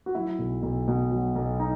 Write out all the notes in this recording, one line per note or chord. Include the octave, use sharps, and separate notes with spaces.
F#4
F#3 E4
B1
B1
B2
F#3
B1
D#4